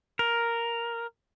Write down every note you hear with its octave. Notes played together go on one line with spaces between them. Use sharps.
A#4